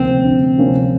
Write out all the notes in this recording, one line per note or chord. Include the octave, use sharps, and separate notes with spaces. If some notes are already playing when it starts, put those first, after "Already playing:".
Already playing: D2 C3 F3 A#3 C4 C#4
D2
C3 F3 A#3 C#4